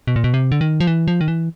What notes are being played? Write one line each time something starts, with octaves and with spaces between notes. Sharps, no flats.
B2
A#2
B2
C3
D3
D#3
F3
E3
F3
D#3
E3